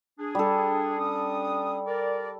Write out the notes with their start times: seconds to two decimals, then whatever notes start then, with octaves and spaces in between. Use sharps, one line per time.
0.19 D4 G#4
0.35 G3 A4
0.98 C#4 D4 D#6
1.87 A#4 D5